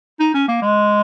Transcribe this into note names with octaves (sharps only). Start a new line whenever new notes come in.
D#4
C#4
A#3
G#3